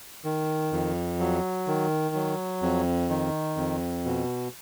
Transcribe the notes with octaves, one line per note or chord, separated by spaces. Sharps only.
D#3
F2
F#3
D#3
F#3
F2
D#3
F2
B2